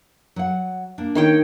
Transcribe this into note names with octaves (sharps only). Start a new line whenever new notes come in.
F#3 F#5
A#3 D4
D#3 C#5 G5